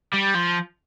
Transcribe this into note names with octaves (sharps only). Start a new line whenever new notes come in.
G3
F3